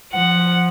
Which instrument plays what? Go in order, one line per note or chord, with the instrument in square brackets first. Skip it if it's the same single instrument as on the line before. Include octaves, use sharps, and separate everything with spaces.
[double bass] F3 [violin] F#5